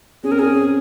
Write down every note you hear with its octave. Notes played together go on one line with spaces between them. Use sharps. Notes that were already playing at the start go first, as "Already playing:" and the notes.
C#4 G#4
C4 A#4
C#4 G#4